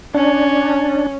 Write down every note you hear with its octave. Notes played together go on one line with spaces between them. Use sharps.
C#4 D4